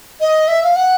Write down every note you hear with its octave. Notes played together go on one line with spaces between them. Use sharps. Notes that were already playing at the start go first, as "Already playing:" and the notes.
D#5
E5
F5
F#5